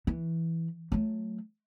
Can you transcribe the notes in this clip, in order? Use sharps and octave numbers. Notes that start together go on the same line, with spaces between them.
E3
F#3 A3